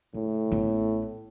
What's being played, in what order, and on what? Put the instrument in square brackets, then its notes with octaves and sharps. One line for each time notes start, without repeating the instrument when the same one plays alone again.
[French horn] A2 [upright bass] C#3
[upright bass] A1 B3